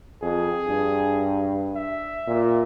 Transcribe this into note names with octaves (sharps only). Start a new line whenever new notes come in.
F2 G#4
G2
E5
A#2